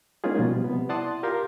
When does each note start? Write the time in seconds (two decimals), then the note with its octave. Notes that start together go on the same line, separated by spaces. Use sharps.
0.24 G#3 A#3 C#4 D#4 F4 G#4
0.39 B2 F3 G3
0.64 C3 B3
0.89 E4 D5 F#5 A5 C6 D#6
1.23 F4 G4 A#4 F5 G5 C6